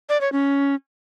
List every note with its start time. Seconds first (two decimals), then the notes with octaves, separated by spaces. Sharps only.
0.09 D5
0.21 C#5
0.32 C#4